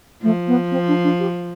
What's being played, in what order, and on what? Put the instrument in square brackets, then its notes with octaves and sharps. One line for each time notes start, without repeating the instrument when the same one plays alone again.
[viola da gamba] F3 [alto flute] A3
[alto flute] B3
C4
D4
D4
G4